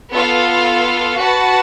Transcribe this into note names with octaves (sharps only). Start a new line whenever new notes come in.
B3 F4 A4 F5
F#4 B4 F#5 A5